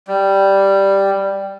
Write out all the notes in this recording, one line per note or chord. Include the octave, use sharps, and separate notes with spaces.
G3